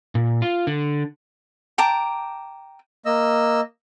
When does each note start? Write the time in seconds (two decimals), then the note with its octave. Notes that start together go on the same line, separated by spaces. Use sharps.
0.15 A#2
0.42 F4
0.67 D3
1.78 G5 A5 A#5 D6
3.06 A#3 D#5 E6